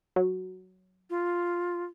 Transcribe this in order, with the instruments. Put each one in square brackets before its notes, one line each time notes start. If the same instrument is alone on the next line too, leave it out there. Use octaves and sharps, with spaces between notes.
[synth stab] F#3
[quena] F4